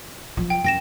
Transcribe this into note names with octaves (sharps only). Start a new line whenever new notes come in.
F3 F#3
G5
F#2 G5 A#6 E7